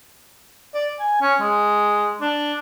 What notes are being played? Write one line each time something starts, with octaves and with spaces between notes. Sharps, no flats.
D5
G#5
C#4
G#3
D4